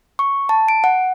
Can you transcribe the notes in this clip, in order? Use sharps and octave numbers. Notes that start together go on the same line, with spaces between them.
C#6
A5
D7
F#5